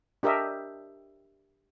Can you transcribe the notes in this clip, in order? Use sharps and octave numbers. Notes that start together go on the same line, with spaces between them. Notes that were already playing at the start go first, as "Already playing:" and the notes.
D4 G4 A#4 D#5 E5